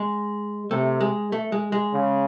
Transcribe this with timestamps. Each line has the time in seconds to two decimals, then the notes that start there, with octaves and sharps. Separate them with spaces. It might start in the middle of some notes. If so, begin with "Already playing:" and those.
Already playing: G#3
0.71 C3 A3
1.01 G#3
1.32 A3
1.52 G#3
1.72 G#3
1.93 C#3